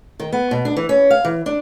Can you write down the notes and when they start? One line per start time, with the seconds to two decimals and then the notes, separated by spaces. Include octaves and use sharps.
0.20 D#3
0.32 B3
0.51 B2
0.65 D4
0.76 E3
0.89 C#4
1.10 F5
1.25 E3
1.46 D4